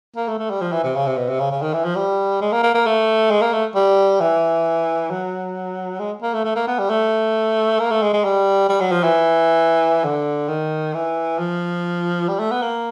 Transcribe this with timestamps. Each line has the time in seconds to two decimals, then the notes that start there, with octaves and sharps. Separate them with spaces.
0.16 A#3
0.28 A3
0.39 A3
0.50 G3
0.61 F3
0.72 E3
0.84 C3
0.96 C#3
1.07 C3
1.17 B2
1.29 C3
1.40 C#3
1.51 C#3
1.62 D#3
1.74 E3
1.85 F3
1.96 G3
2.41 G#3
2.52 A#3
2.63 A#3
2.74 A#3
2.86 A3
3.31 G#3
3.42 A#3
3.53 A3
3.75 G3
4.21 E3
5.11 F#3
6.00 G#3
6.22 A#3
6.34 A3
6.45 A3
6.56 A#3
6.67 B3
6.79 G3
6.90 A3
7.80 A#3
7.91 A3
8.02 G#3
8.13 G#3
8.25 G3
8.69 G3
8.81 F#3
8.92 F3
9.03 E3
10.04 D3
10.49 D#3
10.94 E3
11.39 F3
12.28 G3
12.40 A3
12.51 B3
12.62 A#3